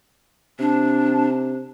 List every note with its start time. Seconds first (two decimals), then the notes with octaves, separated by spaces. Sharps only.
0.60 C3 D4